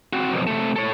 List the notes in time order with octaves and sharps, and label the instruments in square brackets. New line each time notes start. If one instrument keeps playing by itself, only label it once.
[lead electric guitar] C4 F#4
B1 F2
C3 A3
A4 C#5